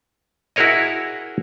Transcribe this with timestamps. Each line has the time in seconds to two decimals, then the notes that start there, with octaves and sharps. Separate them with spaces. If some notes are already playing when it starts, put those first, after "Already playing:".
0.56 E4 F#4 G#4 A#4 C#5 D#5